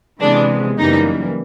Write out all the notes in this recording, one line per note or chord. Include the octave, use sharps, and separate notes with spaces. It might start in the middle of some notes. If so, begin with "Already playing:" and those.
C3 E3 G#3 B3 D4
F#2 C#3 E3 G3 A#3 D#4